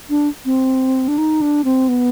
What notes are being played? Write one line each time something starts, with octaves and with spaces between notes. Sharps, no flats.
D4
C4
D4
D#4
D4
C4
B3